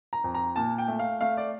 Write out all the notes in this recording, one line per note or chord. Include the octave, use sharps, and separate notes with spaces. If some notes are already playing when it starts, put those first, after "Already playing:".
A#5
F2
A#5
A#2 A5
G5
A3
F5
A3 F5
D5